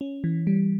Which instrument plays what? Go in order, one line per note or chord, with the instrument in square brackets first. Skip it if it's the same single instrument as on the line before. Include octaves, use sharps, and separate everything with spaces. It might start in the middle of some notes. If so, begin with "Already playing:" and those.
[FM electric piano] C#4
E3
G3